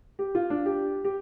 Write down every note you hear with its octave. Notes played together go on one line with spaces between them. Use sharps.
G4
F4
D4
G4
G4